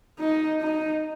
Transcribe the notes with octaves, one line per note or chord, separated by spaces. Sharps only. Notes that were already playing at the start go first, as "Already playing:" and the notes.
D#4
D#4